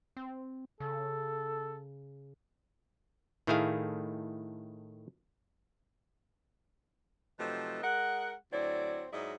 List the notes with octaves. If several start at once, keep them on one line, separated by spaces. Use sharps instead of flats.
C4
C#3 A4
A2 D#3 A3 E4 G#4 F5
C3 F3 F#3 A3 D#4 B4
G#3 A#4 D#5 F#5
D2 F#3 C4 E4 D5
G#2 F#3 E4 D5 D#5